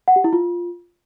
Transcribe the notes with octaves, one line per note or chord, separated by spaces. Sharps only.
F#5
G4
E4
F4